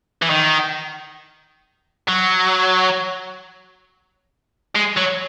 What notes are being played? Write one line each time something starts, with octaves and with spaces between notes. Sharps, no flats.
E3
D#3
F#3
G#3
F#3